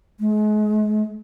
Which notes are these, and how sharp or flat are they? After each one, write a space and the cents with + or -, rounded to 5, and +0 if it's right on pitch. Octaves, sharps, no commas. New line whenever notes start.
G#3 +40